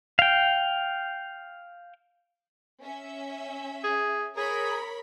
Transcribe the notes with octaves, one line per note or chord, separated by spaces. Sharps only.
F5 G5
C#4 E5
G#4
G#4 A#4 C#5 B5